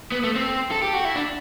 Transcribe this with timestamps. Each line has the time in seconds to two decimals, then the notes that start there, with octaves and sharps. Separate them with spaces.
0.12 B3
0.24 A3
0.36 C4
0.71 A4
0.82 G4
0.94 F#4
1.05 E4
1.16 D4